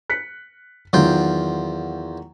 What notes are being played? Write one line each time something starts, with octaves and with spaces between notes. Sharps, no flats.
F#6 B6 C#7
E2 D#3 F#3 F4 G5